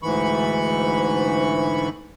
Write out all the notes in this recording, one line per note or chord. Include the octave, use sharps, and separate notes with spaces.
D2 G#2 E3 B5 C#6